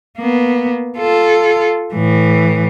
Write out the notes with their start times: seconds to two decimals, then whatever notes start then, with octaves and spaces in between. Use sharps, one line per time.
0.17 A#3 B3
0.97 F4 A4
1.93 A2 E3